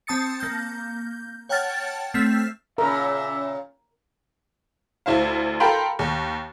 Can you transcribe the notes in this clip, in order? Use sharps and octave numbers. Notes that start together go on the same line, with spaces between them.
C4 A5 D#6 A6 C#7
A#3 G6
C#5 F#5 G5 A5 F6 A6
A3 C4 F6 B6 E7
A#2 C#3 A#4 E5
D2 E4 C5 F5
A4 A#4 F5 G5 B5 C6
D#2